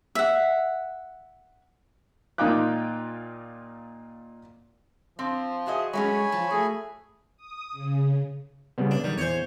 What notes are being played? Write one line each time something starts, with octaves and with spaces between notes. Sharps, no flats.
E5 F#5
A#2 D#4 F4 G5 D6 F#6
F3 C4
F#4 G#4 D#5 E5
F#3 G#3 A3 C#4 C#5 G#5 B5
F3 A5
A3 F#4 G#4
D#6
C#3
C#3 G3 B3
D4
D#3 G3
E2 C5 C#5